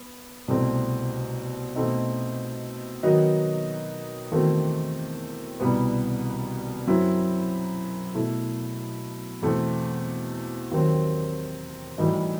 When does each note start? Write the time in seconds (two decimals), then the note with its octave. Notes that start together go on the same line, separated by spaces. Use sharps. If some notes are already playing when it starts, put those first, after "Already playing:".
Already playing: B3
0.48 C2 B2 A3 C4
1.75 B2 A3 C4 D#4
3.03 D#3 F#3 B3 D#4 F#4
4.32 E2 D#3 A3 C4 F#4
5.60 C2 B2 G3 B3
6.87 F#2 F#3 C4 E4
8.14 B2 A3 E4
9.42 E2 B2 A3 C4
10.71 D#2 D#3 F#3 C4
11.98 A2 E3 G3 D#4 F#4